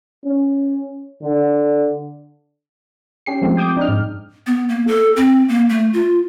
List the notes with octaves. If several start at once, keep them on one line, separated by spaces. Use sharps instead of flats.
C#4
D3
C#4 G4 C7
F3 G#3 A3 C4
G5 D6 D#6 G6
D4 D#4 F6
G#2
B3
A#3
A4
C4
A#3
A3
F4